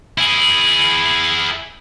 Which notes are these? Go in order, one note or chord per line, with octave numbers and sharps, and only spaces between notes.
E4 G#4